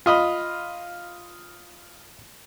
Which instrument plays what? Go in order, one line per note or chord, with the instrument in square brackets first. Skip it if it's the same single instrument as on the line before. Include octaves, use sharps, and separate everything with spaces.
[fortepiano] F4 D#5 B5